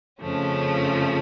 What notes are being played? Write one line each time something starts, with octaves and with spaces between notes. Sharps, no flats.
F2 C#3 F3 A3 C#4